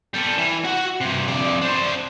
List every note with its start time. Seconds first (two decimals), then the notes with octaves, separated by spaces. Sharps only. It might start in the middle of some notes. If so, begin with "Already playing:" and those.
0.14 G3 A4
0.38 E3
0.64 F#4 F#5
1.01 G2 C3
1.28 F2 D5
1.62 D4 C5